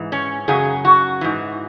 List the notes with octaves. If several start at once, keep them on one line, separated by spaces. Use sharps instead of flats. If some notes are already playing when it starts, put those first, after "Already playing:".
Already playing: G#2 E3
C#4
F#2 C#3 F#3 G#4
F#4
G#2 E3